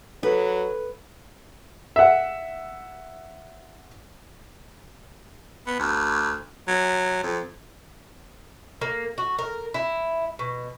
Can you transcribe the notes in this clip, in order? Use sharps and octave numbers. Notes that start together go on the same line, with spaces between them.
F#3 A4 B4
E5 F#5
B3
D2
F#3
F2
A#3
F#4
A#4
E4
B2